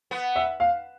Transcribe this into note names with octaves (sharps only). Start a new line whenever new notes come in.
B3
E5
F5